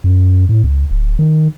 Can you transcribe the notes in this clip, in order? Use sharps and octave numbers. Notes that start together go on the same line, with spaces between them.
F#2
A2
C#2
D1
D#3